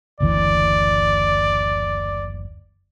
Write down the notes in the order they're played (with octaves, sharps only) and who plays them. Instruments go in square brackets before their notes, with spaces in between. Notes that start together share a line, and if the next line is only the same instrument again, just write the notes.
[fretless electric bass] F#1 D2 E3 [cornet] D5